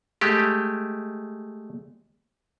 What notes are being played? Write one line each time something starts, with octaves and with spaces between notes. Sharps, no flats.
G#3 A3 G4